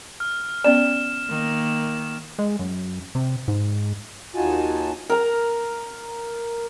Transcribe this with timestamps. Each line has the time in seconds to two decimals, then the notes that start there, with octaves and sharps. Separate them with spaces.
0.20 F6
0.64 B3 C#4 D5 E7
1.29 D#3 A#3
2.39 G#3
2.59 F#2
3.15 C3
3.48 G#2
4.35 D#2 D#4 F4 F#4 G#5 A5
5.10 A#4 A#5